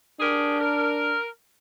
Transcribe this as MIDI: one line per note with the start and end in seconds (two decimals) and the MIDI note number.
0.20 1.16 62
0.20 0.58 67
0.20 0.58 68
0.20 0.58 70
0.60 1.26 70